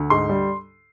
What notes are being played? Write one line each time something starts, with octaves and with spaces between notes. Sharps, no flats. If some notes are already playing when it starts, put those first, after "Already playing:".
Already playing: D2
G#2 C6
G3